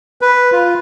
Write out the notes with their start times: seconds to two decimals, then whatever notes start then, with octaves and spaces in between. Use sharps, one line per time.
0.21 B4
0.52 F4